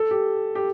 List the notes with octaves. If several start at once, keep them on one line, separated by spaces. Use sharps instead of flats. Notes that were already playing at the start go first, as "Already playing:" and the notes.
Already playing: A4
G4
G4